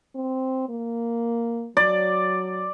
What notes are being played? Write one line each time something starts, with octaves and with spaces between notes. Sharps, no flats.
C4
A#3
F#3 D5